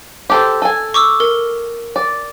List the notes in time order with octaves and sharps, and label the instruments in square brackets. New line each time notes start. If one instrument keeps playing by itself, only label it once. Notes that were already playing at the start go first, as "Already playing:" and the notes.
[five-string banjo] G4 A4 C5
A4 G#5
[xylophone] C#6 D6 E6
A#4
[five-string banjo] D5